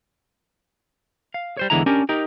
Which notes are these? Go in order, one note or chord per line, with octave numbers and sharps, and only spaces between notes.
F5
G3 C5 C#5
E2 D3 E3 G#3 E4 A#5
C#4 D4 G4 A#4
D#4 G4 A#4